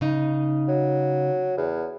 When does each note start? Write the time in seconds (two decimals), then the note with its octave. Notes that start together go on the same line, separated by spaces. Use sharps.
0.01 C#3 D#4
0.68 F#3
1.57 E2